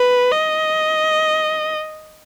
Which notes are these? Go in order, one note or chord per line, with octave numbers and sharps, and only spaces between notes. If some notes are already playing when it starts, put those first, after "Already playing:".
Already playing: B4
D#5